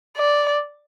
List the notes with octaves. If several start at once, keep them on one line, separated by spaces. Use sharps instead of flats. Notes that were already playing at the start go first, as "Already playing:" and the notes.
D5